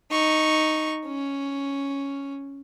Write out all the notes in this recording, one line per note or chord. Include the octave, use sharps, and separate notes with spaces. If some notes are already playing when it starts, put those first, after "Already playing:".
D#4 C#6
C#4